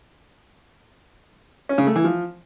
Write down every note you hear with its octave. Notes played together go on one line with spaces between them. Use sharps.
C#4
C#3
A3
E3
F3